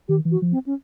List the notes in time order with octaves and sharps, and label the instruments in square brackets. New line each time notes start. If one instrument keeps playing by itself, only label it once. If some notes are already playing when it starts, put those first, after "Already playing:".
[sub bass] D#3 [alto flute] G4
[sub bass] E3
[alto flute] F#4
[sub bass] F3
[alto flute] C4
C#4